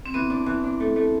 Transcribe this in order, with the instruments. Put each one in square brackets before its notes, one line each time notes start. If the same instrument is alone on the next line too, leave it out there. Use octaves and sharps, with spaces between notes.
[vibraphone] C4
[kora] E3 [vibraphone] B3
[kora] D4
E3
D4
A3
A3